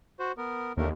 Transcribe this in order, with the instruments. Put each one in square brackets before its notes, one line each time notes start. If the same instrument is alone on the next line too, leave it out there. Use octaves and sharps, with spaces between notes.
[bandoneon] F#4 C5
B3 A#4
[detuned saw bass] D#2 [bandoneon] D3 A3 A#4